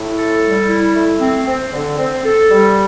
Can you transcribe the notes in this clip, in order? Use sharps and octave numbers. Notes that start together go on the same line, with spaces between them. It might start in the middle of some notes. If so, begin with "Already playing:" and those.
Already playing: A2
A4
G3
E4
A3
C4
C4
D3
C4
A4
G3